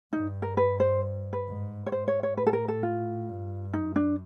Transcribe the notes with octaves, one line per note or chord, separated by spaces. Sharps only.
G2 D#4
A#4
B4
C5
B4
G#2
C#5
G#2 C5
C#5
C#5
A2 B4
A4
A#4
A4
F4
G2
F#2 D#4
D4